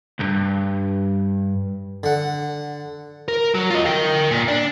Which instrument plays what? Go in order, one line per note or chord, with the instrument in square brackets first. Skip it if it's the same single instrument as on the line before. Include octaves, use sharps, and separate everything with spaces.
[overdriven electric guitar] C#2 G2
[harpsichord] D3 F#5
[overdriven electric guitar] A#4
F#3
F4 D#5
A#4 G5
A#2
D4